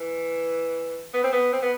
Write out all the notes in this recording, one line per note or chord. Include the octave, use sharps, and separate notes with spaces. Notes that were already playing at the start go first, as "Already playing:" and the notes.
Already playing: E3
B3
C4
B3
C4
B3